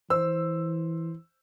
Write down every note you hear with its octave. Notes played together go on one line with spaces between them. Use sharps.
E3 C5 E6